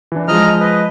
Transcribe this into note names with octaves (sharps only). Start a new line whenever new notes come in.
E3 D4
F3 G#3 D#5 A#5 F6
B4 D#5